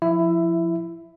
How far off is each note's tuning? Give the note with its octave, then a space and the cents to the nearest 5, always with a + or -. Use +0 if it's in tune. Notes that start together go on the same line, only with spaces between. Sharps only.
F3 +0 E4 +15 E5 +0